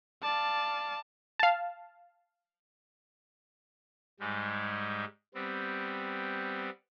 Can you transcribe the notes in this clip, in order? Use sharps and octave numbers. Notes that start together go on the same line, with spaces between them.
D5 F5 A5
F5 A5
G#2 G3 G#3
G3 B3 C4